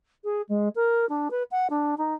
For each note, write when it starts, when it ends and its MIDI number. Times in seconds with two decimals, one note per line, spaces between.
0.24 0.42 68
0.49 0.69 56
0.76 1.08 70
1.09 1.28 62
1.31 1.43 71
1.51 1.67 78
1.70 1.95 62
1.98 2.15 63